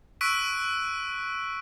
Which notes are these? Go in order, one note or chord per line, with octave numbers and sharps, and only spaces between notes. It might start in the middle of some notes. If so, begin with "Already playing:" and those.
C#6 E6 F#6 B6 D7 D#7